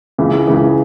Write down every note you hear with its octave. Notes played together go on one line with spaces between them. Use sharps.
C#2 C#3 E3
C#2 C#3 E3